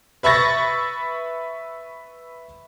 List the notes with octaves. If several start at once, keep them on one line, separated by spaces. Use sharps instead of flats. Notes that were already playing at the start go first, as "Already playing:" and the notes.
B4 E5 B5 C#6 A6 A#6